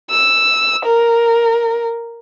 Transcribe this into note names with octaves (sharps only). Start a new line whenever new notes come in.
E6
A#4